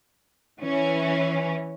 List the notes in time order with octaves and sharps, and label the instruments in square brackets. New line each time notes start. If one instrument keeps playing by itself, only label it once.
[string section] E3 C#4